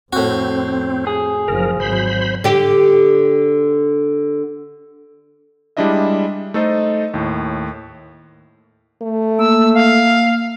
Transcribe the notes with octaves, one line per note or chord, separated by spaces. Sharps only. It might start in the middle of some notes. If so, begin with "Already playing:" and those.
F2 A2 C4 F#4
G#4
F#1 F3 A#4
G#1 F#3 C5 B5
D3 G4
G3 G#3 D4 E4 D#5 E5
A3 D#4 A4 C5 D#5
D#2 A2
A3
A#3 E6
F5